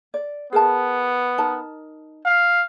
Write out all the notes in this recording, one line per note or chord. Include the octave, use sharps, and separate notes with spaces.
D5
B3 G#4 A#4 A5
D#4 A#4 A5
F5